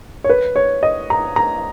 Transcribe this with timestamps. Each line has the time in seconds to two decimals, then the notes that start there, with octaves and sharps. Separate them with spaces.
0.24 C#5
0.29 B4
0.56 C#5
0.83 D#5
1.10 A#5
1.36 A#5